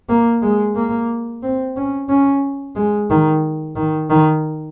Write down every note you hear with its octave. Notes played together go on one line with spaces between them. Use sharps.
A#3
G#3
A#3
C4
C#4
C#4
G#3
D#3
D#3
D#3